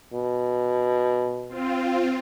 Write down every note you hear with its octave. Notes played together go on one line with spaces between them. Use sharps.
B2
C4 F4